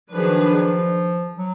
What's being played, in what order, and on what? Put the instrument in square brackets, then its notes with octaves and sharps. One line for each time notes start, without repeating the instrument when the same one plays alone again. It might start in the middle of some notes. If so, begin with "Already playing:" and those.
[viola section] D#3 F#3 D4 G#4 B4 [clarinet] F3
[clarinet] F#3